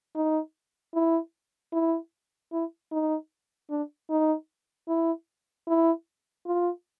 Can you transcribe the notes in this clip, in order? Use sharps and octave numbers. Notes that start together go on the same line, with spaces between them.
D#4
E4
E4
E4
D#4
D4
D#4
E4
E4
F4